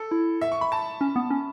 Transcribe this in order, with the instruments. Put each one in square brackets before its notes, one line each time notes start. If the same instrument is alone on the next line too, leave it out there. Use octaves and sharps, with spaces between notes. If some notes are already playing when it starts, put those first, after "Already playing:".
Already playing: [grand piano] A4
[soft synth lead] E4
[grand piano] E5
C#6
B5
A5
[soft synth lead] C#4
B3
C#4